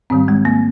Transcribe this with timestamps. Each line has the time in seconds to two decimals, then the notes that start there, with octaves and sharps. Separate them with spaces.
0.10 G#2 D#3 G3 C4
0.28 G#3
0.45 A#3